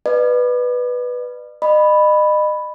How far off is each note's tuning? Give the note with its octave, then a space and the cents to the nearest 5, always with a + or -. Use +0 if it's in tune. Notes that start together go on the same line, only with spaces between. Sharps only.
B4 +0 D5 +40
D#5 -35 B5 +0